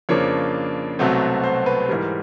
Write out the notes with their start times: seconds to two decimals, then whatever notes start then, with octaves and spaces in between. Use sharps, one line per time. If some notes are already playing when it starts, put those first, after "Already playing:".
0.09 F2 C#3 F3 A#3 D4 C#5
0.99 C2 B2 F#3 A3 C4
1.43 C5
1.66 B4
1.89 G#2 E3 G3 A#4